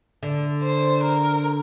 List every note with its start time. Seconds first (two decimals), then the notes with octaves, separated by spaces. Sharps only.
0.23 D3
0.63 C5
1.03 A#4